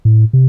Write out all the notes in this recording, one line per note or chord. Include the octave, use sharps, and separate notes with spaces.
A2
C3